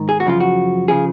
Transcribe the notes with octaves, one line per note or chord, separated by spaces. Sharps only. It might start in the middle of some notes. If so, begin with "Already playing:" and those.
Already playing: G#2 D#3
G#4
F#4
F#2 C#3 F3 F4
F#4
C#3 F3 G#4